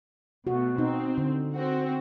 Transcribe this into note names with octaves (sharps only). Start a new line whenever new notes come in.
B2 A3 F#4
C4 D#4
D3
C4 F#4